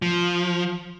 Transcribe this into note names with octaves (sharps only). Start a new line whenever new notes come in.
F3